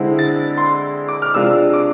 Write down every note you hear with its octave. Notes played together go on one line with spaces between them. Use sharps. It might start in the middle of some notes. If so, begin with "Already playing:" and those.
Already playing: D3 G#3 C4 E4
A6
C6
D6
F6
C3 G#3 D4 F4 E6
D6